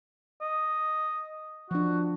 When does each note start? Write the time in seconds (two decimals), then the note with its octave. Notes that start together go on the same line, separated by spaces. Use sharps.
0.42 D#5
1.71 F3 D4 F#4